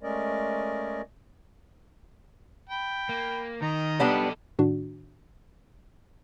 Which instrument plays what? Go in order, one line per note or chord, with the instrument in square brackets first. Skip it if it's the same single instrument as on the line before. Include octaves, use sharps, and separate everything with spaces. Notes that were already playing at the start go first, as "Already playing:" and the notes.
[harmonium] G#3 A3 C#4 A#4 D5 D#5
[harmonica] G5 B5
[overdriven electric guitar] A#3
[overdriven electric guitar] D#3 [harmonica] D#5 A#5
[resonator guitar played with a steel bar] G3 B3 D4 [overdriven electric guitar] D#4 A4
[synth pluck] A2 D#3 D4 F#4